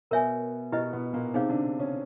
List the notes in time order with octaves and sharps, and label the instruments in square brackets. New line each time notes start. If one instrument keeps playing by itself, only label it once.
[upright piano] B2 B3 [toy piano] A#4 C#5 E5 G#5
[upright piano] B2 B3 [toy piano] E4 G4 B4 D#5
[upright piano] B2 B3
A#2 A#3
[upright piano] C3 C4 [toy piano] D#4 G#4 C#5 F5
[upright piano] D3 D4
C#3 C#4